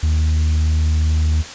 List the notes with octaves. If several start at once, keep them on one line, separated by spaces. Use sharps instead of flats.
D#2